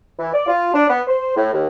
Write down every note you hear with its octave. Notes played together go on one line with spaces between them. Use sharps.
E3
D5
F4
D4
B3
C5
A2
D#2